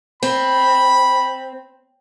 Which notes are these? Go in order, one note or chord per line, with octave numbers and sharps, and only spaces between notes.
C4 B5